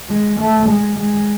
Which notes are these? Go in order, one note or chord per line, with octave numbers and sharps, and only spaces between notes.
G#3
A3
G#3
G#3